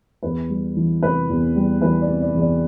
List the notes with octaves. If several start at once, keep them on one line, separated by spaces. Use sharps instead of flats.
E2 B4
G3
E3
C3 B4
E2
G3
E3 B4
D5
C3
D5
E2
D5